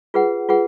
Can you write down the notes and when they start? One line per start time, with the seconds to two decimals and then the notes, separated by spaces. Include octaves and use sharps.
0.14 F4 G#4 B4 F#5
0.49 F4 G#4 B4 F#5